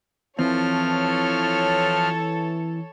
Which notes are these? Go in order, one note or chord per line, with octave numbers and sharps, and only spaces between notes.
E3 F3 C4 A4 C#5 F6